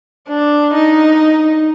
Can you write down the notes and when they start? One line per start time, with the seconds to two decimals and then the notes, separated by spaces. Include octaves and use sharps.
0.28 D4
0.74 D#4